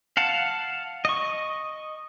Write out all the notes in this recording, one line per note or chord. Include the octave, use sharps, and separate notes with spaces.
F5 F#5 A5
D#5 C#6